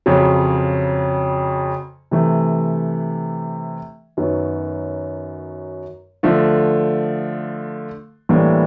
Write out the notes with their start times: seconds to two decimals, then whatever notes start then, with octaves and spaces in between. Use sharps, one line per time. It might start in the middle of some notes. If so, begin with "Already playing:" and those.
0.06 F2 C#3 F#3
2.11 C3 E3 A3
4.17 F#2 D#3 F#3 B3
6.23 D3 F3 A3
8.29 A2 E3 G3 A#3 D4